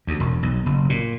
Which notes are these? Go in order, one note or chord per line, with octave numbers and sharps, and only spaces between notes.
D2
E1
B1
F#1
A#2